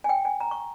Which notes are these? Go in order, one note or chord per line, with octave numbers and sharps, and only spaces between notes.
G#5
G5
G#5
A#5
C#6